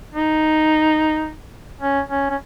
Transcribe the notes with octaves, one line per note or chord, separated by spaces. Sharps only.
D#4
C#4
C#4
C#4